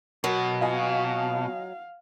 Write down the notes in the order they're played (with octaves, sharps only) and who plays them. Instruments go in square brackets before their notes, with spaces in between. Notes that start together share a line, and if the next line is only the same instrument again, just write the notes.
[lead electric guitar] B2 [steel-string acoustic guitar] F#3 [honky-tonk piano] A#4
[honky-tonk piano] F4 D#5 G#5 [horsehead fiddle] F5